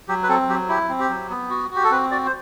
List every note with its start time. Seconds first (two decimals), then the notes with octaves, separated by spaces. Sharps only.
0.08 F#3 G4
0.23 B4
0.29 C4 A4
0.49 F#3 G4
0.69 E4 G4
0.89 C4
1.00 G4
1.10 F#3
1.30 B3
1.50 F#4
1.71 F#4
1.76 G4
1.84 A4
1.91 C4 B4
2.11 F#4 D5
2.26 C5